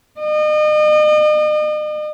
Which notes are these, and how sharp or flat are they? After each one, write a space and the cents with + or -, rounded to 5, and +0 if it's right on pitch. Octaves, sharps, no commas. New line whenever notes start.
D#5 -40